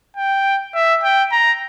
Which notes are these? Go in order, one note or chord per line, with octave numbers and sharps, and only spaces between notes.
G5
E5
G5
A#5